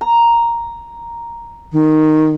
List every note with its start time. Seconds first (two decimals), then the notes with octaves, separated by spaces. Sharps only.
0.01 A#5
1.73 D#3